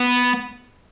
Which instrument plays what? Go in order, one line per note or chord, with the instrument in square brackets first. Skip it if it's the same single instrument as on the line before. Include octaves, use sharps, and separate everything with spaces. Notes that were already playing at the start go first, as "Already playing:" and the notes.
Already playing: [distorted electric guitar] B3